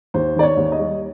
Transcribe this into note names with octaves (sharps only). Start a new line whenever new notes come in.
D#2 C5
D#3 D5
C#5
D#2
D#5
G3